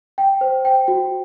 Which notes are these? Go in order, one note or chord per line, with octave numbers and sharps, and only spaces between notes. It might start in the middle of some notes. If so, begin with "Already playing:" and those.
G5
C5
G5
F#4